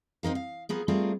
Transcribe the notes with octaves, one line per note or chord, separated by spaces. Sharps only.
C4 D#4 A#4 F5
F5
F3 B3 G#4 A#4
G3 A3 C4 F4 G#4 A#4